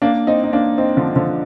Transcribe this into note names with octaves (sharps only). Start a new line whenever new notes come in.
A#3 D4
C4 D#4
D#4
A#3 D4
C4 D#4
D3 F3
D3 F3